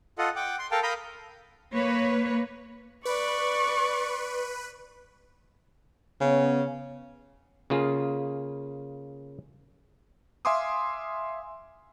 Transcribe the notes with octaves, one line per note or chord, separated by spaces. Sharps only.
F4 A4 D#5 F#5
F#5 G5 D6
C6
A4 A#4 F5 G5 A5
A#4 F5 A#5 B5 D#6 G6
A#3 B4 C#5
B4 D5 C#6
C#3 B3 C#4
C#3 A#3 F4 G#4
E5 F5 G#5 C6 D6 D#6